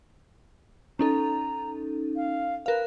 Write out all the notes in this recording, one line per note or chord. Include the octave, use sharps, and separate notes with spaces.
C#4 D#4 A4 A#5
F5
A#4 B4 F5